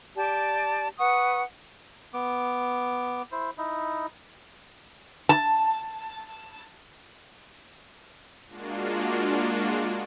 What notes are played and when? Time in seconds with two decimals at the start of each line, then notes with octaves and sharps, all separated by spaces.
0.15 G4 D5 A5
0.98 B4 F#5 C#6 D#6
2.14 B3 D6
3.32 E4 C5
3.58 D#4 E4
5.29 A5
8.49 G#3 A#3 D4 F4 F#4